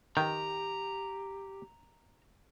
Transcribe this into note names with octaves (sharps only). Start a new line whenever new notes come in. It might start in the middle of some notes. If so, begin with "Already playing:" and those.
D#3 G4 G5 A#5